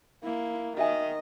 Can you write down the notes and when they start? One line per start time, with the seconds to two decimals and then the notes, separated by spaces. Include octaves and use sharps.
0.24 A#3 E4
0.77 D#3 F#4 D#5 E5 G#5